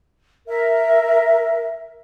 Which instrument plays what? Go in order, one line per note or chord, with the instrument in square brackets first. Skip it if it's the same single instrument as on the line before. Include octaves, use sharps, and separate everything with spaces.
[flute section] A#4 E5